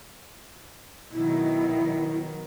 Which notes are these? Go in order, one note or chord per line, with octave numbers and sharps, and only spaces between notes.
B2 D#3 F#3 E4